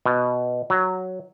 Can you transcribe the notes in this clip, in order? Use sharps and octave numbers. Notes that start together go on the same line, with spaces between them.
B2
F#3